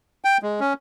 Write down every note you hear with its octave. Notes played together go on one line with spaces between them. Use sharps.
G5
G#3
C#4